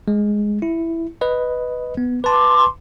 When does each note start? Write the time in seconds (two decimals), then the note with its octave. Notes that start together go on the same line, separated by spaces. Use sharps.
0.08 G#3
0.62 E4
1.21 B4 D#5
1.97 B3
2.24 B4 A5 C6 D6